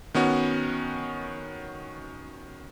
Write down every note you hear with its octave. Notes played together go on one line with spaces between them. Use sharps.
D#3 B3 C#4 F#4